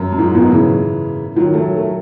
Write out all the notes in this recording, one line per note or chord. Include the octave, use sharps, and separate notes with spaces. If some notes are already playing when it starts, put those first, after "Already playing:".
Already playing: F#2
F#2
G#2
G#2 B2
C#3 E3
D#3 F#3
F#3 A3
A3